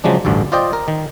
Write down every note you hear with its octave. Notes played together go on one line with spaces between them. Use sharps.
C#3 F3 F#3 G#3 D4
A1 D2 G2 D3
F4 C5 D5 D#5 G5
A#4
D#3